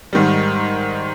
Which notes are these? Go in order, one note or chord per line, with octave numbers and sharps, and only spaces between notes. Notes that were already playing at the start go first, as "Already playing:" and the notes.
G#2 D#3 G3